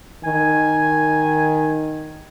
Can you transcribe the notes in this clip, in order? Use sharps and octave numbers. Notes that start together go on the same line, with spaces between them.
D#3 G#5